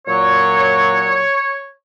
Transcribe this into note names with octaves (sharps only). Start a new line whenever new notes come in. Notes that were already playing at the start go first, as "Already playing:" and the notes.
A#2 F#3 C#5